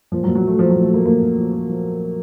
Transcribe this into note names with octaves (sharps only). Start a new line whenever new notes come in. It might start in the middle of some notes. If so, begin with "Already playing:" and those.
A#2 F3
F#3
A#2
F#3
A#2 A3
A#2 F3
A#2 F#3
A3
F3 A#3
A#2 A#3
A#2
F3
F3
F3